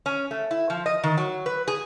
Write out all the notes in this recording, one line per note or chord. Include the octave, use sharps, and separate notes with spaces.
C#4
A3
E4
F3
D#5
D#3
F#3
B4
G#4